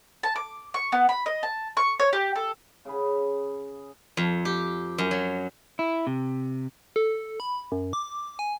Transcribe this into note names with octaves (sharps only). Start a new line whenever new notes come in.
A5
D6
C#6
B3
B5
D#5
A5
C#6
C#5
G4
A4
C#3 G#4 B5
F2
G4
F#2
F#3
E4
C3
A4
B5
F#2
D6
G#5